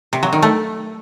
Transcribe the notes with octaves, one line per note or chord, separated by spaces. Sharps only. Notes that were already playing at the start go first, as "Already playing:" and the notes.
C3
F#3
D#3
A3